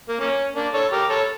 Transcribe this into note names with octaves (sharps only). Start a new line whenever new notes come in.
A#3
A#3 C#4
A#3 D4
A4 C#5
G4 A#4
A4 C#5